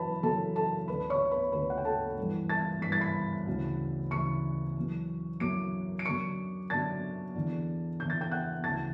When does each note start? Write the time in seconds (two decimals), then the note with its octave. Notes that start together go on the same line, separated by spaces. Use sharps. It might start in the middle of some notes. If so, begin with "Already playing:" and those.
Already playing: F#2 E3 B4 A5 B5
0.23 F#2 E3 A4 A5
0.56 A4 A5
0.88 D2 D3 B4 B5
1.10 C#5 C#6
1.31 B4 B5
1.52 D2 D3 B4 B5
1.70 F#5
1.77 G5
1.85 A4 A5
2.17 G2 E3
2.49 A5 A6
2.82 G2 E3 B6
2.92 A6
3.01 B5 B6
3.47 D2 C#3 E3
4.11 D2 C#3 E3 C#6 C#7
4.76 F#2 E3
5.40 F#2 E3 D6 D7
5.99 D7
6.05 F#2 D3 C#6 C#7
6.70 F#2 D3 A5 A6
7.35 E2 D3
7.99 E2 D3 G6
8.10 A6
8.21 G5 G6
8.32 F#5 F#6
8.64 D2 C#3 E3 A5 A6